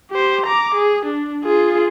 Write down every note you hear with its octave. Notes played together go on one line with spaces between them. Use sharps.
G4 C5
A#5 D6
G#4
D4
F4 G#4